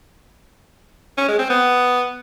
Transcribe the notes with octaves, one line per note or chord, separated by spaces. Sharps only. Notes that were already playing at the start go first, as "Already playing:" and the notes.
C#4
G#3
C4
B3